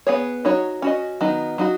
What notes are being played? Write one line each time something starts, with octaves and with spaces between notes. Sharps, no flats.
B3 G#4 C#5
F#3 D#4 F#4 C#5
C#4 F#4 D#5
D#3 F#3 B3 D#4
F#3 D#4 F#4